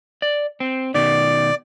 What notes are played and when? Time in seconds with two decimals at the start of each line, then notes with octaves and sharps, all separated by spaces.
0.22 D5
0.60 C4
0.94 B2 D#3 D5